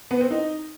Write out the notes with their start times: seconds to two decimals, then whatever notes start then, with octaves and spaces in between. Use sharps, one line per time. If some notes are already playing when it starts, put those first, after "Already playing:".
0.11 B3
0.21 C4
0.31 D#4